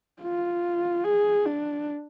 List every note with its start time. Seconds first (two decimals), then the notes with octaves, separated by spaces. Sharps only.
0.22 F4
1.04 G#4
1.46 D4